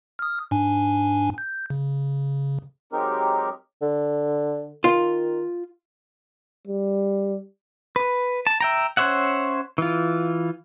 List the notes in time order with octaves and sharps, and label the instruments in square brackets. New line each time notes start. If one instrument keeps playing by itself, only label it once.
[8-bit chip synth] D#6 F6
G#2 D4 G#5
G6
C#3
[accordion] F#3 G#3 C4 D#4 G4 A#4
[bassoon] D3
[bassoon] D#3 [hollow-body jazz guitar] F4
[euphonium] G3
[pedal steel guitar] B4
A5
E5 G5 A#5
C#4 C5 C#5 E5 F#5
E3 F4